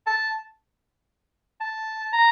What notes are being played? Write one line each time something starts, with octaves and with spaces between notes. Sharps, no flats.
A5
A5
A#5